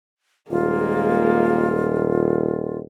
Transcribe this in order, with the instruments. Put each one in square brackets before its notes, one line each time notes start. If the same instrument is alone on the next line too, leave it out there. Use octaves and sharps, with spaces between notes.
[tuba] D#1 [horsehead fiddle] G#3 A#3 [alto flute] F4